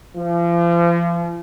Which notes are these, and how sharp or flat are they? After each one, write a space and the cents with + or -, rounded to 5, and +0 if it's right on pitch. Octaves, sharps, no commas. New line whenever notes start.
F3 -35